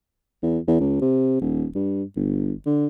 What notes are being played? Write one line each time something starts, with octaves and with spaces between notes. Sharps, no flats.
E2
E2
C#2
C3
D#1
G2
G1
D3